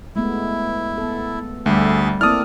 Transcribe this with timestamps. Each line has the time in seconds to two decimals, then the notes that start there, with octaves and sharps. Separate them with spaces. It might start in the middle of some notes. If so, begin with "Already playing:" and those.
0.16 G#3 A3 B3 E4
0.98 B3 A4
1.66 D2 G3 A3 G#4 E5
2.21 A#3 C4 E4 A4 D5 D#6 F6